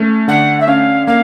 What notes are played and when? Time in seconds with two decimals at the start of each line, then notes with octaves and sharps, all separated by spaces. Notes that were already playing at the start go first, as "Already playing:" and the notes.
Already playing: A3 C#4
0.28 D3 F#5
0.60 E5
0.67 C#4 F5
1.07 A#3 F5